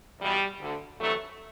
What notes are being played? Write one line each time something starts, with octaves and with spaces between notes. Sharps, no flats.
E2 B2 G3
D2 D3
D2 C3 E3 F#3 A3